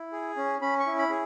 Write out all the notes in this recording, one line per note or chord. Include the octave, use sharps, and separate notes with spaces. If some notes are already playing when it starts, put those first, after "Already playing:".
Already playing: E4
G#4
C#4
C#4 B5
C#6
E4
B5
G#4